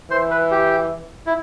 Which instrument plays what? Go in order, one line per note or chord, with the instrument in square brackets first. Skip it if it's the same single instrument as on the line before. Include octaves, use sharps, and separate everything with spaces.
[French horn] E3 [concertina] C5
[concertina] B4
G4
E4